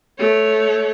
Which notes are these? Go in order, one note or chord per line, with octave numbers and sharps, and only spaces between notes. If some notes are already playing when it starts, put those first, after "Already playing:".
A3 C#5